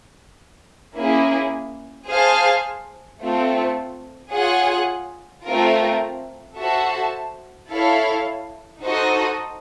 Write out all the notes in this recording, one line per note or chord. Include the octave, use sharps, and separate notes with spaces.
A#3 C#4 E4 G#4
G#4 C5 F5 A5
A3 C4 F4 A4
F4 G#4 C#5 F#5
A3 C4 F4 A#4
F#4 A4 C5 E5 A5
E4 A4 C#5 F5
D#4 F#4 A4 C5 D#5